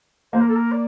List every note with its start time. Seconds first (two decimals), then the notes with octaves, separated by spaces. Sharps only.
0.32 A#3 C5
0.41 A#4
0.48 A4
0.56 A#4
0.72 D5